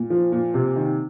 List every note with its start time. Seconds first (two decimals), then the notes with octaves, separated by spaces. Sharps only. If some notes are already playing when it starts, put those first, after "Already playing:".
Already playing: A#2
0.10 F3
0.32 A#2
0.54 C3
0.76 D#3